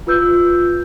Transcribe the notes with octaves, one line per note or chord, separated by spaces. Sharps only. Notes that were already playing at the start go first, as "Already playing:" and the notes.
F4 B4 E6 G6